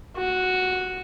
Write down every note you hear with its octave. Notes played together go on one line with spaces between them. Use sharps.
F#4